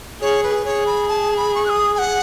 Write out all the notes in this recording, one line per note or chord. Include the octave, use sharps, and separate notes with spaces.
G#4 C#5
B4
G#4 C#5
B5
A5
B5
C#6
F#6
D#6
G#5
F#5